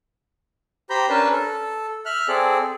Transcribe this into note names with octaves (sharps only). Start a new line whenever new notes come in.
G4 C5 A#5 B5 G6
C#4 D4 A#4 B4 A5
A4
E5 F6 F#6
C4 G#4 A4 D5